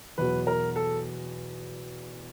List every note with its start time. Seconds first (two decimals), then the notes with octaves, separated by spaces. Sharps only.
0.18 E2 B2 F#3 B4
0.47 A#4
0.76 A4